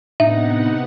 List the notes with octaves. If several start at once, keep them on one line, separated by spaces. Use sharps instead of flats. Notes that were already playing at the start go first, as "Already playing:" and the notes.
A2 C3 B3 D4 D#4 E5 F#5